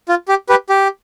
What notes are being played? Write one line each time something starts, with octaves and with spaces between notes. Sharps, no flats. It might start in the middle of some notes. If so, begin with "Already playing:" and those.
F4
G4
G4 B4
G4